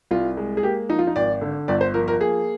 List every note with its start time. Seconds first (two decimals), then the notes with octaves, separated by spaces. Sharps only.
0.11 C2 F4
0.37 G#3
0.57 G#4
0.63 A#3 G4
0.89 F3 D#4
0.99 F4
1.07 D#4
1.16 G#1 D5
1.41 D3
1.68 G1 D5
1.81 C5
1.94 F3 A#4
2.08 A#4
2.21 A#3 G#4